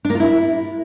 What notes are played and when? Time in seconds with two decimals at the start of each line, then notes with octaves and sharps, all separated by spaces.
0.05 D4
0.10 A#3
0.15 F4
0.20 E4